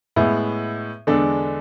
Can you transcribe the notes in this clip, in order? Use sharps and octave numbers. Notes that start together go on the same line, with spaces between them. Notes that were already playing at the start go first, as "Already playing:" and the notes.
A2 G#3 B3 E4
E2 D3 G#3 D4 A4